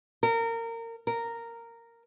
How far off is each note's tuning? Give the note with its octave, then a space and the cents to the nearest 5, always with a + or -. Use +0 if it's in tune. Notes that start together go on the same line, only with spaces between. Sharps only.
A#4 -25
A#4 -10